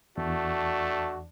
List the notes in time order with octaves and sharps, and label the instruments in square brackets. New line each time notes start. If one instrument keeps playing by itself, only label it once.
[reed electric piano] E2 [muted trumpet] A3 [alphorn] D4 [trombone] F#4